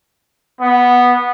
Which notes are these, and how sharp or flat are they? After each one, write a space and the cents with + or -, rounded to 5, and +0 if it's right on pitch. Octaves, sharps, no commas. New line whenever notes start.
B3 -5